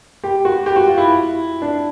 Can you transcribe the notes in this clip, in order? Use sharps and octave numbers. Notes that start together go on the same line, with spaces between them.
G4
F#4
G4
F#4
F4
E4
D4